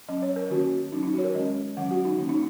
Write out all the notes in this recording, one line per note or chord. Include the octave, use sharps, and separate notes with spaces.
F#3 C#4 D#5
C#5
A#4
D#3 A#3 C#4 F#4
F#3 C#4 D#4
D#4
F#4
C#5
A#4
D#3 G#3 C#4 D#5
D#3 F#3 C#4 F#5
F#4
D#4
D#3 A#3 C#4
D#4